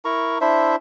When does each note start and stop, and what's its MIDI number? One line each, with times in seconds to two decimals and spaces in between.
0.05 0.38 64
0.05 0.38 70
0.05 0.38 82
0.05 0.38 85
0.41 0.76 62
0.41 0.76 64
0.41 0.76 72
0.41 0.76 76